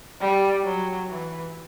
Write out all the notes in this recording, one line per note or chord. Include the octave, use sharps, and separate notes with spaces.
G3
F#3
E3